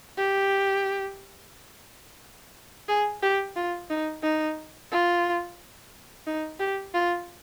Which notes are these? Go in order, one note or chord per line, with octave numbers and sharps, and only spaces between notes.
G4
G#4
G4
F4
D#4
D#4
F4
D#4
G4
F4